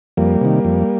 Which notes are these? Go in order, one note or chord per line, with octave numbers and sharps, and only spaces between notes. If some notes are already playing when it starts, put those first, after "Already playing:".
F2 G3 A#3
C3 D#3
F2